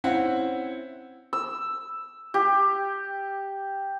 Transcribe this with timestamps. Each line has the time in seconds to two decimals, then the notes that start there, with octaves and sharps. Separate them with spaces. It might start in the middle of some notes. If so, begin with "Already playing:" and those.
0.04 C4 C#4 E4 F#5
1.33 E6
2.34 G4